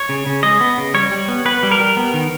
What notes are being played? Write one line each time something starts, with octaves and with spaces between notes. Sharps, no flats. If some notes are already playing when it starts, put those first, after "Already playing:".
Already playing: C#5
C#3
C#3
G#3 D#5
B3
C#3
G3 C#5
G3
B3
B3 B4
G3
A#4
G3
B3
D#3